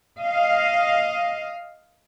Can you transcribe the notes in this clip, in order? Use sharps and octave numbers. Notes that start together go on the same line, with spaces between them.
D#5 F5